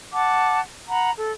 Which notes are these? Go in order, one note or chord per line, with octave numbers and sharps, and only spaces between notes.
F#5 A5 D6
F#5 A#5 B5
A4